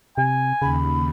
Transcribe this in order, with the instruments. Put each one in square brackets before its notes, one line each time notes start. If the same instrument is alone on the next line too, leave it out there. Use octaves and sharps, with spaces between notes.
[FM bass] C3 [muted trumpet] G#5
[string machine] D#2 [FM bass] C#3 [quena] B5